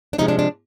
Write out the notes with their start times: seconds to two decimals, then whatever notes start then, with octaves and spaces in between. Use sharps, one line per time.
0.13 D4
0.18 C3 F3 G#3 D#4
0.28 D4
0.39 D4